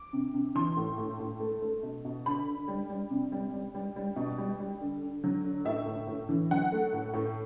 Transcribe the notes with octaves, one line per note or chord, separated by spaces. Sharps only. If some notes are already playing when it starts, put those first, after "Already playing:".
Already playing: D6
C3
C3
E3 C6
A2
A2
A2
A3
A3
B2
B2
D3 B5
D3
G3
G3
C3
G3
G3
G3
G3
B2
G3
G3
D3
D3
F#3
D3
A2 E5
A2
A2
E3
F#3 F#5
A3
A2
A2